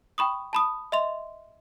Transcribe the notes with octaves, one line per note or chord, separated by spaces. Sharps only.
G5 B5 C#6 D#6
A5 B5 D#6
D#5 E5 C6 F7